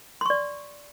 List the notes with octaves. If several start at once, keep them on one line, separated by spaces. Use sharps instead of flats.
D5 C6 C#6